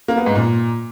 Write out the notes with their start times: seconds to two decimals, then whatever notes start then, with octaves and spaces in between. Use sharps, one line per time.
0.08 A#3
0.17 B3
0.26 G#2
0.35 A#2